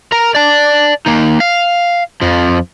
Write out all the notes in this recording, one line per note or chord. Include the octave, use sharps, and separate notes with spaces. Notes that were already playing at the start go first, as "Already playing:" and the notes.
A#4 A#5
D5 A5
A#3 D#4
F5
F2 F3